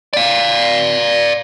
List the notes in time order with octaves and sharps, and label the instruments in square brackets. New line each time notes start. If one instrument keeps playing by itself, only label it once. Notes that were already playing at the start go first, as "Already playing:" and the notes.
[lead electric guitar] D5 F5